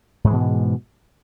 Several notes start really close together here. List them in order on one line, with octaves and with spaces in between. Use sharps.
G#2 G#3 E3 B2